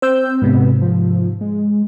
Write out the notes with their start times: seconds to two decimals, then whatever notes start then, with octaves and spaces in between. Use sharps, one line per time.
0.02 C4 C5 E6 G6
0.42 G#2 C3 B3
0.81 F3
1.41 G#3